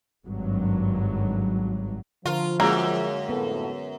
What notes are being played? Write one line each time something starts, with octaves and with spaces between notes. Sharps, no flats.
G#1 G2 F#3
D3 F3 F4 A#4
F#2 G#3 A#3 F#4 G#4
F2 A2 B3 A4